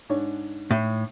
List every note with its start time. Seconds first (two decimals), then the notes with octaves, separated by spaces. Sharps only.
0.09 G#2 D4 C#5
0.71 A2